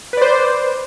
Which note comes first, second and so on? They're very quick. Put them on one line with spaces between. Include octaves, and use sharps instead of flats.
B4 D5 C5